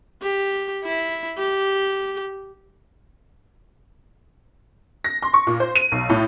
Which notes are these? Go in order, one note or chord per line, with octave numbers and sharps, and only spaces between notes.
G4
E4
G4
A#6
C6
C#6
A#2
C5
D#7
B1
A2